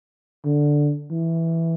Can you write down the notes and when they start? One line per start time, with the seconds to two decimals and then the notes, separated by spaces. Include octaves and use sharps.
0.45 D3
1.11 E3